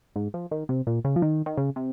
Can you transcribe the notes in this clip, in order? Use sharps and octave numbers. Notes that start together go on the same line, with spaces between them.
G#2
F3
D#3
C3
A#2
C#3
F3
D#3
D#3
C#3
C3